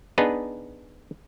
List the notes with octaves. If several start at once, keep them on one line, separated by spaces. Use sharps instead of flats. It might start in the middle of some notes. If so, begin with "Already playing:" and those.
B3 D4 D#4 G#4 B4